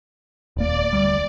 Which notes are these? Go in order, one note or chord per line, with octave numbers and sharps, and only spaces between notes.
D#1 A#3 D5
D2 G3